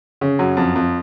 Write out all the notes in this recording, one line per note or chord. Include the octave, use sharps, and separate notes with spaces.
C#3
F#2
F2
F2